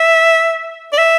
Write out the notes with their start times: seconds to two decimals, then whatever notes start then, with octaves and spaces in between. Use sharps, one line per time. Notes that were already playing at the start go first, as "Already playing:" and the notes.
Already playing: E5
0.93 D5
0.98 E5